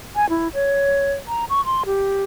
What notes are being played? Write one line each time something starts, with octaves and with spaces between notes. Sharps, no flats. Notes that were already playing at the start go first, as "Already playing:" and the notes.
G#5
E4
C#5
A#5
C#6
C6
G4